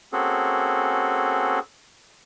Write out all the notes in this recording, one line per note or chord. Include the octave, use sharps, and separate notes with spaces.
A#3 C4 C#4 F#4 G#4 A4